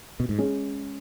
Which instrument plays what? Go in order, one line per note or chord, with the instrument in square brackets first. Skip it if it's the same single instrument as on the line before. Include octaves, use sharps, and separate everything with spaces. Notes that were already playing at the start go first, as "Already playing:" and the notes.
[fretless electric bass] B2
G#2
[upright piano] G#3 C#4 G#4